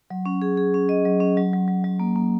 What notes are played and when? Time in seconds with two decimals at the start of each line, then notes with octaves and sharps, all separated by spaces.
0.10 F#3
0.26 C#4
0.42 G#4
0.57 G#4
0.74 C#4
0.89 D#5
1.05 F#3
1.20 C#4
1.37 F#3
1.53 F#3
1.68 F#3
1.84 F#3
2.00 A#3
2.16 A#3